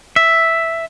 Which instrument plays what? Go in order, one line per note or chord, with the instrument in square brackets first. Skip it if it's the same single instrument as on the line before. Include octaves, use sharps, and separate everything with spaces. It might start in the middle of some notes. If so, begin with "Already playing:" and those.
[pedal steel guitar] E5